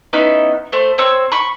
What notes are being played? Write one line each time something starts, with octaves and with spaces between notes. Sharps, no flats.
B3 C#4 D#4 E4
A3 C5
C4 C#5 E6
B5 C#6